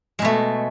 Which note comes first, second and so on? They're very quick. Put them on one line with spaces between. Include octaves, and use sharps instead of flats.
G#3 B2 A3